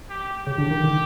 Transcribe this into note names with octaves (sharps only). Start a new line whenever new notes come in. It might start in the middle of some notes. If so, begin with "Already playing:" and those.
G4
C#3 G4
D3
D#3
D#3